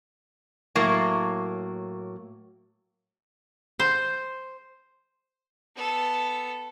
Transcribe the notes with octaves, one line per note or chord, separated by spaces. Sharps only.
A2 F#3 A#3
C5
B3 A4